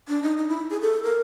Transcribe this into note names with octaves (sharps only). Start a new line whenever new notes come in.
D4
D#4
D#4
E4
G#4
A4
A#4